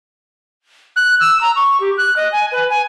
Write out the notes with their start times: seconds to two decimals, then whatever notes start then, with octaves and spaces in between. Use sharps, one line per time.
0.96 F#6
1.20 E6
1.41 A#5
1.56 C#6
1.80 G4
1.98 F#6
2.16 D#5
2.32 G#5
2.52 B4
2.70 G#5